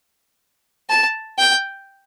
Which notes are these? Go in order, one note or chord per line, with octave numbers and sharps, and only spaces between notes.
A5
G5